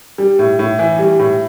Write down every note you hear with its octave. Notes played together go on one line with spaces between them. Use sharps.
G3
A2
A2
E3
G3
A2